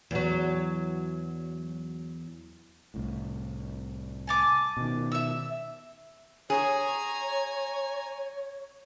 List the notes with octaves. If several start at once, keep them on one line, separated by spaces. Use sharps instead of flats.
E2 F#3
C2 A2
G#5 A5 D6
B2 D#3
E5 E6
G#4 C#5 G#5 A#5